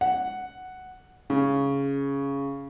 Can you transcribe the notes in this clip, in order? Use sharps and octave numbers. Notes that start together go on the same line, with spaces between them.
F#5
C#3